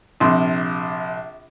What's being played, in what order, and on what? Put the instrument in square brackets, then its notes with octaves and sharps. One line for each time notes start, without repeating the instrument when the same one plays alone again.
[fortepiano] A#1 C3 C6